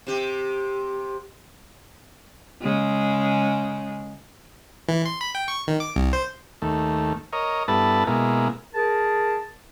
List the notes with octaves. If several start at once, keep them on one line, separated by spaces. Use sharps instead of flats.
C3 G4
C#3 G#3
E3
C6
B5
G5
C#6
D#3
D6
C2
C5
D#2 A3
A#4 C#5 D#5
G2 B3 E4 A4 B4 A5
B2 G#3 A#3 E4
G#4 A#4 A5